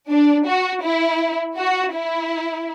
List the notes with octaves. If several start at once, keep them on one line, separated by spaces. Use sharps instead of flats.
D4
F#4
E4
F#4
E4